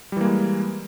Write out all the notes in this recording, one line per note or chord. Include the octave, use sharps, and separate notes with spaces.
E3 G3 G#3 A#3